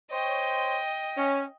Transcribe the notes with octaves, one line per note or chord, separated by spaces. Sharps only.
C5 C#5 D#5 G5
C#4